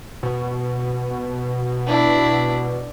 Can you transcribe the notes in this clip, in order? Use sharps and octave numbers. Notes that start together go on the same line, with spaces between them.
B2
D4 E4